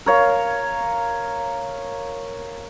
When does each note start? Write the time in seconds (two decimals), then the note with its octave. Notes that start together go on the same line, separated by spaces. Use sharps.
0.06 A#4 C#5 F5